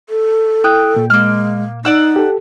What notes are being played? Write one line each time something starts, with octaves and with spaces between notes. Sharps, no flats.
A4
E4 G5 D#6 F#6
A#2
G#3 A#3 F6
D#4 D5 F#5 E6
G4 A4